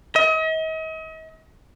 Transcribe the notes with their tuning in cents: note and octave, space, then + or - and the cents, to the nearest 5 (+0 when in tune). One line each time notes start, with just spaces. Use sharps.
D#5 +40